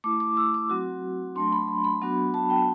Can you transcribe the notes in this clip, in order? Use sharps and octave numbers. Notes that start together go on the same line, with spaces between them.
A3 E4 D6
D6
E6
D6
F#3 C4 F#4
F#3 A3 D4 C6
B5
B5
B5
F#3 B3 D4 F#4
A5
G5